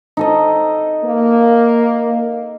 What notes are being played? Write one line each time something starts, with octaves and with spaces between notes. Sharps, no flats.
D#4 A4 D#5
A#3